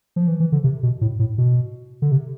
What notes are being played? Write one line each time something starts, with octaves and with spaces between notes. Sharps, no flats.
F3
E3
E3
D3
C3
B2
A2
A2
B2
D3
C3